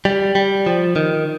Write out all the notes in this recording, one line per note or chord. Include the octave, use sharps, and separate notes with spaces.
G3
G3
F3
D#3